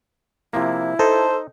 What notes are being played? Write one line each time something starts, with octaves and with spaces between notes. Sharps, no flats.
C3 F3 A#3 E4
D#4 A4 C5